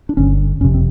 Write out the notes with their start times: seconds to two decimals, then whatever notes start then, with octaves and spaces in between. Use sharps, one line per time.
0.09 D4
0.17 G1 G2 D3 C#4
0.60 F#1 F2 C3 C#4
0.74 C4